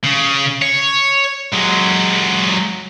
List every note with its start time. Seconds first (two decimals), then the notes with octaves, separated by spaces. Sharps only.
0.04 C#3
0.62 C#5
1.53 F#3 G#3